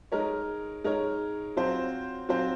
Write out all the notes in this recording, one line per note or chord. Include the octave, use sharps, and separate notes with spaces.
G#3 D#4 A#4 C#5
G#3 D#4 A#4 C#5
F#3 C4 F4 C5
F#3 C4 F4 C5